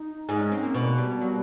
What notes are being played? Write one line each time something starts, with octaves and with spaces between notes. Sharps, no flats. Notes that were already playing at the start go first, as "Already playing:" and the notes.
Already playing: D#4
G#2
C#4
C4
A#3
B2 A#3
G3
F#3